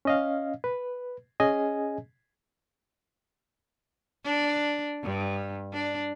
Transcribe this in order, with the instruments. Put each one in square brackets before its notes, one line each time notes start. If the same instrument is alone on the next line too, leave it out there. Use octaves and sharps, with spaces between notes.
[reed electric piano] C#4 D#5 F5
B4
C#4 G#4 D#5 G#5
[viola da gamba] D4
G2
D4